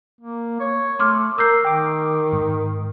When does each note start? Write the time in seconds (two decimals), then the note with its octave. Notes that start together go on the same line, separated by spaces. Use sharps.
0.21 A#3
0.60 C#5
0.99 A3 C6 D6 F6
1.38 A#4 E6 G6 C7
1.65 D#3 G5 D6
2.33 G#2